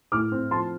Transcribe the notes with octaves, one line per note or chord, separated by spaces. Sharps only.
A2 D6 F6
C4
F3 A5 C6